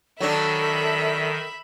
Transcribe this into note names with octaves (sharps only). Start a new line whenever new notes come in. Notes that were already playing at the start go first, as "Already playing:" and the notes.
D#3 F#3 D4 A4 E5 B5